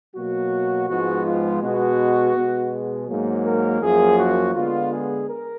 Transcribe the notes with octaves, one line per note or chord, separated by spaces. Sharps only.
B2 F#3 A#3 F#4
G#2 F3 G#3 B3 F#4
F4
B2 G#3 B3 F#4
B2 G#3 B3
G#4
G#2 F#3 A#3
A#4
F#2 F3 A#3 G#4
F#4
D3 G#3 B3 F4
G#4
A#4